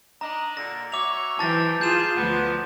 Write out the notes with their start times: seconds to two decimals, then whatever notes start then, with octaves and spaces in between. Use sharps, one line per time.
0.21 D4 D#4 D#5 A#5
0.57 A#2 D3 A#6
0.92 F#4 C#5 E5 D6 F7
1.39 G#2 C3 E3 G5 A5 A6 A#6
1.81 F4 G#4 G6 E7
2.16 D2 F3 B3